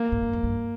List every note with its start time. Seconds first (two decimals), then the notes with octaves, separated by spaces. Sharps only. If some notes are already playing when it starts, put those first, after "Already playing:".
Already playing: A#3
0.12 G#2
0.23 G2
0.33 F2
0.43 G2